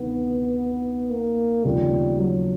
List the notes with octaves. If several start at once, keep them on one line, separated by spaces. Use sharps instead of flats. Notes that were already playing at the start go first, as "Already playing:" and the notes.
Already playing: D2 C3 D#3 B3
A#3
D#2 C#3 F3 G3 A3 C4
F#3